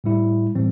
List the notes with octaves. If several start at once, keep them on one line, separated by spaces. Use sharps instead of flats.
A2 G3 E4
A2 E3 G3 C4